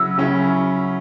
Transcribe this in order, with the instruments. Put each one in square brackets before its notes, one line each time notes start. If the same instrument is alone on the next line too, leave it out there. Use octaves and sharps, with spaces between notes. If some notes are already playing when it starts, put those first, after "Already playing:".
Already playing: [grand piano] C#3 F#3 C#4 E4 [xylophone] E6
[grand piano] C#3 F#3 C#4 E4